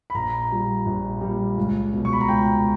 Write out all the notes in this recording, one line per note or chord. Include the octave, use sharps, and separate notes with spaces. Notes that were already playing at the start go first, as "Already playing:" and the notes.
B5
A#1 A#5
A#2 G3
A#1
G3
A#2
C#2
B2 F#3
C#6
B5
A#5
C#2 G5